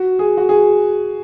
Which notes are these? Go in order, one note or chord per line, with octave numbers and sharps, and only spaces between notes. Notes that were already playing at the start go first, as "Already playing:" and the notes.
Already playing: F#4
G#4
F#4
G#4